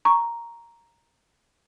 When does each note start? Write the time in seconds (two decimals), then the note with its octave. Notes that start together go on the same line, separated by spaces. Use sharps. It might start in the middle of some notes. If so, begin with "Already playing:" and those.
0.05 A#5 C#6